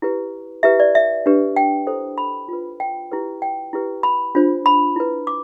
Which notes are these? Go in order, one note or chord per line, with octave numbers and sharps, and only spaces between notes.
E4 G4 B4
E4 G4 B4 E5
D5
E5
D4 G4 B4
G5
E4 A4 C5
B5
F4 B4
G5
E4 G4 B4
G5
E4 G4 B4
B5
D4 F4 C5
B5
E4 B4
D6